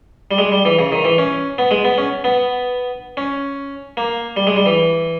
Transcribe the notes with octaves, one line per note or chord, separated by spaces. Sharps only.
G3
G#3
G3
E3
C#3
D#3
E3
C#4
B3
G#3
B3
C#4
B3
C#4
A#3
G3
G#3
G3
E3